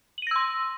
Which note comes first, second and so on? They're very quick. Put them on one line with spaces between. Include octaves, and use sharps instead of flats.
F#7 D#7 A#6 E6 C6